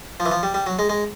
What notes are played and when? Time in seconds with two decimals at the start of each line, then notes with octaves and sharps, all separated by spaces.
0.20 F3
0.26 E3
0.31 F3
0.43 G3
0.54 G3
0.66 F#3
0.79 G#3
0.89 G#3